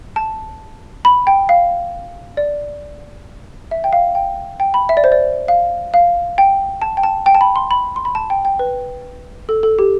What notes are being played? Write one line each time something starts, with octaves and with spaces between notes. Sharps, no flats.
A5
B5
G5
F5
D5
E5
G5
F5
G5
G5
B5
E5
D5
C5
D5
F5
F5
G5
A5
G5
A5
G5
A5
B5
C6
B5
C6
B5
A5
G5
G5
B4
A4
A4
G4